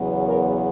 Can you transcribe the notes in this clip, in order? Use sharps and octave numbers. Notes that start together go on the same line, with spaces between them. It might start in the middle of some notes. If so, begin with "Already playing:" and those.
Already playing: E2 C#3 F#3 B3
A#4